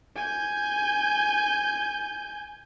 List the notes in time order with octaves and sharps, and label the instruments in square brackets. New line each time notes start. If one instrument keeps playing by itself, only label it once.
[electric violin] G#5 G6